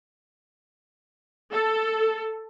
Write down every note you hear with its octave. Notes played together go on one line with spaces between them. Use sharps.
A4